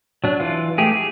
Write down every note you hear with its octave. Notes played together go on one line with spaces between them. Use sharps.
F#3 D4
E3 F4
A3 G4 G#4
G#4